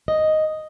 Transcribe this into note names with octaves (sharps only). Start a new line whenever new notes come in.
D#5